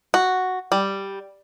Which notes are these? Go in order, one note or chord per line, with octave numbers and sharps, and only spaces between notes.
F#4
G3